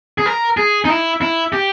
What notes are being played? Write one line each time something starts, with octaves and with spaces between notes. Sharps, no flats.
G#4
A#4
G#4
D#4
E4
E4
G4